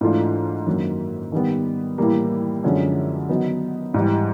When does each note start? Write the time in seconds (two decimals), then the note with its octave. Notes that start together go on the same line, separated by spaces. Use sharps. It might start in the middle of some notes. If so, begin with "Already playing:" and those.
0.01 G#2 E3 A3 D4 F4
0.66 F#2 D#3 F#3 A#3
1.32 D#3 G3 B3
1.98 A2 E3 G3 A#3
2.64 F#2 D3 F3 G#3 C#4
3.29 D#3 F#3 B3 D#4
3.94 G#2 E3 G3